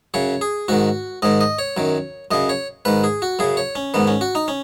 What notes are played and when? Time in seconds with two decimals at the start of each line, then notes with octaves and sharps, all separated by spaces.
0.14 F#2 C#3 C#5
0.41 G#4
0.68 G#2 D#3 F#4
1.22 G#2 D#3 D#5
1.41 D#5
1.59 C#5
1.77 F#2 D#3
2.31 F#2 C#3 D#5
2.49 C#5
2.85 G#2 D#3 B4
3.04 G#4
3.22 F#4
3.39 F#2 C#3 G#4
3.57 C#5
3.75 C#4
3.94 G#2 D#3 B3
4.07 C#4
4.21 F#4
4.35 D#4
4.48 C#4